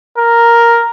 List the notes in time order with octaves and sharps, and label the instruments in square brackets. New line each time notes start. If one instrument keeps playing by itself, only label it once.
[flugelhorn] A#4